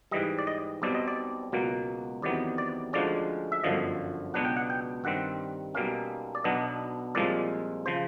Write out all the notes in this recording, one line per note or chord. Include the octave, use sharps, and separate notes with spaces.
G#2 E3 G3 D#5
D5
D#5
B1 B2 G3 C4 D5
D#5
D5
C#2 B2 F#3 A#3
E2 C3 D#3 F#3 B3 D5
D5
D2 D3 F3 G#3 C#4 D5
E5
G1 F#2 D3 F3 D#5
C#2 B2 F#3 B3 D4 F#5
G5
F#5
G5
G2 D#3 G3 C4 F#5
B1 B2 G3 A#3 C#4 F5
D5
B1 B2 F#3 B3 D4 D#5
C2 A#2 F3 G#3 D5
C#3 F3 C5